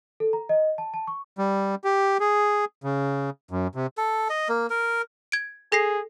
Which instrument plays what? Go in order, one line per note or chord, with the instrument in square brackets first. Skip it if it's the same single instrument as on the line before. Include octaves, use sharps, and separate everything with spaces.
[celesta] A4
A#5
D#5
A5
A5
C#6
[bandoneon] G3
G4
G#4
C#3
F#2
C3
[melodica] A4
D#5
A#3
A#4
[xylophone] G#6 D7
[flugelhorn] G#4 [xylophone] A4 A#6 C7